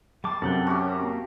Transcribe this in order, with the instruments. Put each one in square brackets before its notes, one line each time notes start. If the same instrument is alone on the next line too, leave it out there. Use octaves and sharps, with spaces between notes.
[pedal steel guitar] G3 D6 [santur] A5 C6
[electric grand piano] F#2 C3 [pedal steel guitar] A4 F#5 G5
[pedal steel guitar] C#4 [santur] F#4 G4
[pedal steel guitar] A#3